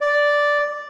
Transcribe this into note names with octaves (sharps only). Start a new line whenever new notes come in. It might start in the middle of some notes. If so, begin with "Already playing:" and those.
D5